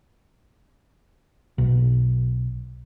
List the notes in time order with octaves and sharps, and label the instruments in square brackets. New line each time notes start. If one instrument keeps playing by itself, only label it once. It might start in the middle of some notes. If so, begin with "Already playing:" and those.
[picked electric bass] B1